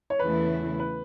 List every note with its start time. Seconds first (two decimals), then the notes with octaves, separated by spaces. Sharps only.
0.10 C#5
0.19 E2 C#3 E3 A3 E4 B4
0.80 B4